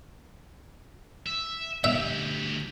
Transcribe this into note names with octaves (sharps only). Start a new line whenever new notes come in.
E5
D2 G4 E5